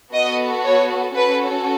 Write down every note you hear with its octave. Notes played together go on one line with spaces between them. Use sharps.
B3 F#4 A4 D#5
C#5
C#4 F#4 A4 B4